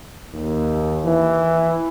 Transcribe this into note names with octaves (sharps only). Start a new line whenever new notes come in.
D#2
E3